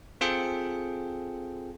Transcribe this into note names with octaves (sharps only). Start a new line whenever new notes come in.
C4 F4 G#4 A4 G5 C#7